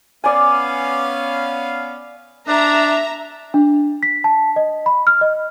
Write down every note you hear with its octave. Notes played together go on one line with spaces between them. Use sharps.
B3 C#4 D5 F5 G#5
D4 E5 A#5
D4
B6
A5
D#5
B5
F6
D#5